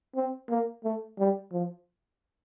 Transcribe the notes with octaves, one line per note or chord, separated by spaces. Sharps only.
C4
A#3
A3
G3
F3